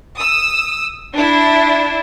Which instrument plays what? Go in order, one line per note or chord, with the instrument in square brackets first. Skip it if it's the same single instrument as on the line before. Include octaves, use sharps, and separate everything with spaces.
[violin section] D#6 E6
D4 E4